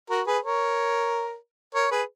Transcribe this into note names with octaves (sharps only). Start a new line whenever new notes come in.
F#4 A#4
G#4 B4
A#4 C#5
A#4 C#5
G#4 B4